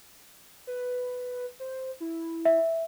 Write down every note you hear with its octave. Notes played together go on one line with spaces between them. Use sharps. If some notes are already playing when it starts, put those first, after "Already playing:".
B4
C5
E4
E5